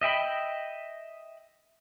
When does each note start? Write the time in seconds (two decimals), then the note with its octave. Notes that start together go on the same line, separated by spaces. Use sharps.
0.01 D#5 E5 G5 B5